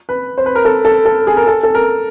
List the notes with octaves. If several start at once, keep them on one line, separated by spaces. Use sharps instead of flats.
B4
C5
B4
A#4
A4
A4
A4
G#4
A#4
A4
A4
A#4